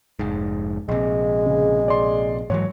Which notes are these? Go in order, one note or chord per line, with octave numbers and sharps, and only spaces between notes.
F1 G#2
A#1 C3 G#3
C#3
D5 C6
G#2 E3 F#3 C#5